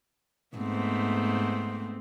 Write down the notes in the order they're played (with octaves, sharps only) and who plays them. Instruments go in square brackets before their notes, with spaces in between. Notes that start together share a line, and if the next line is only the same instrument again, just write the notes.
[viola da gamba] G#2 A3 [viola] B3 C4